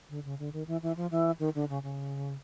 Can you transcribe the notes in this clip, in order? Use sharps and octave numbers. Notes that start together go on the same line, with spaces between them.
D3
C#3
D3
D#3
E3
E3
F3
E3
D#3
D3
C#3
C#3